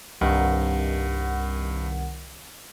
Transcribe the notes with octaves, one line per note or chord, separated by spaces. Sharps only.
C2 G2 D#3 F#5